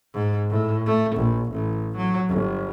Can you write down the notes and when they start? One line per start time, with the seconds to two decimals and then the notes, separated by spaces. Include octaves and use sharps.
0.14 G#2
0.50 A2
0.86 A3
1.16 A#1
1.52 A1
1.97 F#3
2.29 G1